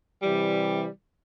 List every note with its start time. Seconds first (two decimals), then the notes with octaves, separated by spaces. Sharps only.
0.22 C3 E3 G3